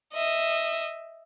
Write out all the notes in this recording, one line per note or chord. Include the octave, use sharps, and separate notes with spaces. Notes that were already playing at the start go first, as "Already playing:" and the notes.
D#5 E5